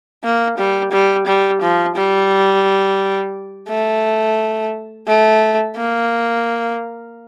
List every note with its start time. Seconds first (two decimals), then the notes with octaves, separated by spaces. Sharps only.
0.23 A#3
0.58 G3
0.92 G3
1.26 G3
1.61 F3
1.96 G3
3.69 A3
5.07 A3
5.76 A#3